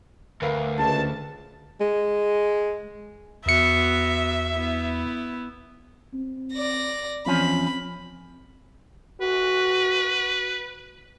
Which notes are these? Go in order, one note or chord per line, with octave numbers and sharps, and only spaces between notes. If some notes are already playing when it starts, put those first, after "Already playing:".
D2 A#4 B4 F5
C#2 A5
G#3
E2 B3 F#4 E5 C#7
B3 E4
C4
D5 A#6
E2 F3 C4 C#4 B5
F#4 B4